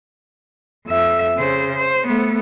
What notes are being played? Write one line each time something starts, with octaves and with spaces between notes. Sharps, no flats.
F2 E5
C#3 C5
C5
A3 B3